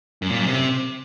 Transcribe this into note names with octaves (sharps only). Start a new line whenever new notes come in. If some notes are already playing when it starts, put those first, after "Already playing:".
F#2
A#2
F#2
C3